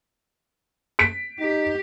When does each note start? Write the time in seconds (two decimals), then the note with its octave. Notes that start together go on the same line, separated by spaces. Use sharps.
0.99 B6 D7
1.39 D#4 G4